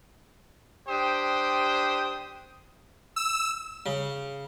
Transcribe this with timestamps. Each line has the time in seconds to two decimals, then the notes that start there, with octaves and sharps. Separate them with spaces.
0.88 D4 G4 C5 G5 D#6
3.16 E6
3.86 C#3